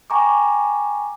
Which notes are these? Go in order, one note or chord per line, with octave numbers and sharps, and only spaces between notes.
G5 G#5 A#5 C#6 D6